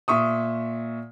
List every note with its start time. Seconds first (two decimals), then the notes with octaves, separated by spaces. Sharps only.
0.08 A#2 E5 C#6 D#6